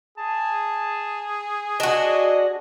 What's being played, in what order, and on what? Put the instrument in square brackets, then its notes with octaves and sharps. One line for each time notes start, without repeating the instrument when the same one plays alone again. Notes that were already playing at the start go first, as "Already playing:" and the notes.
[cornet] G#4 [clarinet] A5
[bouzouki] D4 F#4 [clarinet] D#5